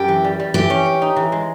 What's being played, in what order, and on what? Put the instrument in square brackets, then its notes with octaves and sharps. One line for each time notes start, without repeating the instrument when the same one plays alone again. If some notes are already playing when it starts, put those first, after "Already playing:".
Already playing: [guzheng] F#2 [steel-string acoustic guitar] G4
[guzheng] E3
G3
G3
[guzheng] E3 [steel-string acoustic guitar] G4
[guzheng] C#4
C#4
D#4
E3
G#3